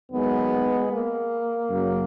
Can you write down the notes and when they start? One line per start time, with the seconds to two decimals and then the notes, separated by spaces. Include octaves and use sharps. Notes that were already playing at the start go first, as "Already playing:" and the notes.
0.12 D#2 D#3 F#3 G#3 B3
0.90 A#3
1.70 F#2 C#3 F#3